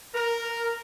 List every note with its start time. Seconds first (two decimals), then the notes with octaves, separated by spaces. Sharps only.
0.14 A#4